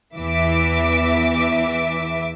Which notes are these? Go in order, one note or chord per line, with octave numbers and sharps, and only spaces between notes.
E2 E3 E5 D6